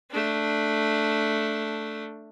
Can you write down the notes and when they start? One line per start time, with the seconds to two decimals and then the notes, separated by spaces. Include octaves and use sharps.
0.11 A3 D4